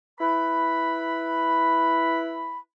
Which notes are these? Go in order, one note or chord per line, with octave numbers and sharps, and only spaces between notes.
E4 B4 B5